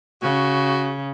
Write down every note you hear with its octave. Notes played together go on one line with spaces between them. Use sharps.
C#3 F#4